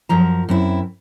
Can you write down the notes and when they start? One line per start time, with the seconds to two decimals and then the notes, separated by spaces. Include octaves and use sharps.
0.09 F#2 F3 A#5
0.49 F#2 C4 E4